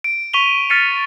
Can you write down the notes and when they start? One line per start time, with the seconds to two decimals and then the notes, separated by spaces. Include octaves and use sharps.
0.04 D7
0.33 C#6 B6 D#7 F7 G7
0.70 F6 A6 B6 C#7 D#7